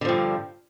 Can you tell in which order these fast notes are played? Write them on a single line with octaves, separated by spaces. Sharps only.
D3 F3 G2